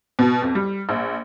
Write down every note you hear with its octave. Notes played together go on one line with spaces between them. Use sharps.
B2
F2
G3
A#1